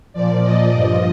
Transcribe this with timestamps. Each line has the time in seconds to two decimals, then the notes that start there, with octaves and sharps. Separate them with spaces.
0.13 A#2 F3 D5
0.43 D#5
0.72 G2 F3 D#5